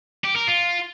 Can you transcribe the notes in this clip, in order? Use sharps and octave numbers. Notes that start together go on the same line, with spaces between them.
G4
A#4
F4